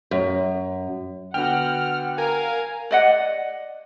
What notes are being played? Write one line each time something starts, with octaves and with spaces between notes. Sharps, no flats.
F#2
D3 B3 F#4 F#5 G5 F6
A#4 F5 G#5
D5 D#5 F#5